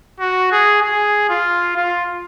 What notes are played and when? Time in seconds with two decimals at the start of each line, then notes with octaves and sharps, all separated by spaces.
0.20 F#4
0.52 G#4
0.83 G#4
1.30 F4
1.76 F4